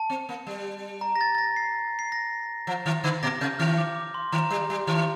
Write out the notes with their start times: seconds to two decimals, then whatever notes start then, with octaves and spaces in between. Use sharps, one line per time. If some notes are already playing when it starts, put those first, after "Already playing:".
Already playing: A5
0.10 C4
0.29 A#3
0.47 G3
1.01 A#5
1.16 A#6
1.21 A6
1.35 A6
1.38 A#6
1.56 C7
1.99 C7
2.12 A#6
2.67 F3
2.86 D#3
3.04 D3
3.23 A#2 A#6
3.41 C3 G6
3.59 D#3 F6
3.78 D6
3.96 D6
4.14 C6
4.32 D#3 A#5
4.50 G3
4.70 G3
4.87 D#3